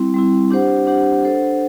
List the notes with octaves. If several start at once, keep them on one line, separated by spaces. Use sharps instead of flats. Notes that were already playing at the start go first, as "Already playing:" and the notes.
Already playing: G3 C4 E4
G3 C4 E4
D4 G4 C5 F#5
D4 G4 C5 F#5
D4 A4 C5 F#5